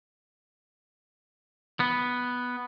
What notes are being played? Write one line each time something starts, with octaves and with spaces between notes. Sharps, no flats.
B3